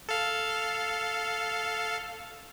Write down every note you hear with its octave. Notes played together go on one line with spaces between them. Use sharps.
A4 F5